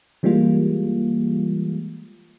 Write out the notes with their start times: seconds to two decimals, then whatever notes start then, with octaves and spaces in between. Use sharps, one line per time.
0.23 E3 G3 G#3 A#3 F4